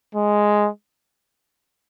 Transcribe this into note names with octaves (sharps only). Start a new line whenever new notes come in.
G#3